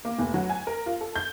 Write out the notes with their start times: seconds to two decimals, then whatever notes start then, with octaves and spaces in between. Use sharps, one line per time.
0.05 A#3
0.19 F1
0.34 F#3
0.50 G#5
0.67 A#4
0.86 F4
1.01 A4
1.16 G6